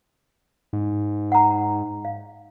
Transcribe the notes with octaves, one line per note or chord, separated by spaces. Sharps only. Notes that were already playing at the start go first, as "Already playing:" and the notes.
G#2
F#5 A#5
F5